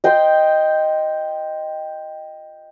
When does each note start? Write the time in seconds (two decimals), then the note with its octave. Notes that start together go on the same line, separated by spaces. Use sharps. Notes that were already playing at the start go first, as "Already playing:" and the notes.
0.04 D#5 G5 C6